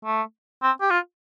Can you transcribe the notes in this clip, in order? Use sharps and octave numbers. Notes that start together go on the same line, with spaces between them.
A3
C4
G4
F4